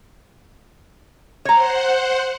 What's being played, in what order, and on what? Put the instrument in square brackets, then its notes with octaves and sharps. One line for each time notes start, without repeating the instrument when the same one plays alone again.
[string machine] C5 F#5 [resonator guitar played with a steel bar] C#5 A#5